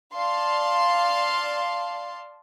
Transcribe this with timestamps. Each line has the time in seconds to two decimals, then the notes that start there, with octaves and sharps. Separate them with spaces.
0.16 D5 F5 A5 C6